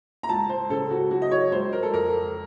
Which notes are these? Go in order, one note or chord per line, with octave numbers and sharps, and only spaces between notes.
A#5
C#2 A5
C5
C#3 A4
F#4
F#3 F#4
D#5
C#5
C#2 C5
A#4
A4
F2 A#4